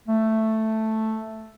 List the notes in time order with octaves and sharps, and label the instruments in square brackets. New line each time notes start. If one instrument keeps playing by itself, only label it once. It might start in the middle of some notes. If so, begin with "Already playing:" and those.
[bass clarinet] A3